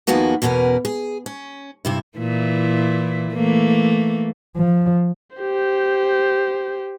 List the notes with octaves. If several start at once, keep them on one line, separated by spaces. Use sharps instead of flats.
D#2 F3 A#3 B3 F#4 G#4
E2 B2 C#4 A#4 B4
G#4
C#4
G2 C3 E4
A#2 E3 E4
E3 A3 A#3
F3
G4 C5